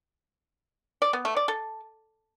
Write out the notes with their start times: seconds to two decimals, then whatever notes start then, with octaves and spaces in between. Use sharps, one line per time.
1.02 D5
1.13 B3
1.25 A3
1.37 D5
1.48 A4